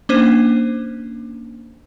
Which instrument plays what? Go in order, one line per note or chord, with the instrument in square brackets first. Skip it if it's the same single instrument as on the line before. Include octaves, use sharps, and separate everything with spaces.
[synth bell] A#3 C#4 D4 C5 D#7